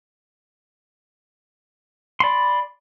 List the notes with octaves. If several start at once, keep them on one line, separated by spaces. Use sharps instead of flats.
D5 B5 C6